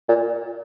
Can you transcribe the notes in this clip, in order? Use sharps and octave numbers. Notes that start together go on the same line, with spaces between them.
A#2